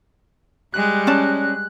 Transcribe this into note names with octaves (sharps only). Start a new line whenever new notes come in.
G3 G#3 F#6
C#4 D5 A5